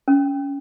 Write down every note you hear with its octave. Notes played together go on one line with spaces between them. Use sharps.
C#4